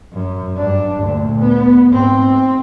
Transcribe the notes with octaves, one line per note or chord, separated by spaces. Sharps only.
F#2
G2 D4
D2 A#2
B3
G#2 C4